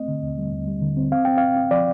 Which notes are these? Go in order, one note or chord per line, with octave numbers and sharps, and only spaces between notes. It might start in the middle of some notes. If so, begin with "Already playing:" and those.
Already playing: A3 C4 D#5
D3
D#2
G3
D#2
G3
D3
C4
C4 F5
C4 G5
C4 F5
C4
F3 D5